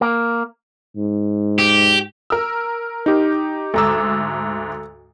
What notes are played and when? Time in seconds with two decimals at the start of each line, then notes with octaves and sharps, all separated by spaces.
0.01 A#3
0.97 G#2
1.59 G4
2.30 A#4 E6
3.06 D#4 G4
3.74 D2 G#2 A4 A#5 D6 E6